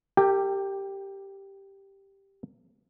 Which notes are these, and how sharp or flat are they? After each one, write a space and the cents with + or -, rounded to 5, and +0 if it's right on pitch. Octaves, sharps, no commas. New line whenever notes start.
G4 +0 A#4 -45 G5 +20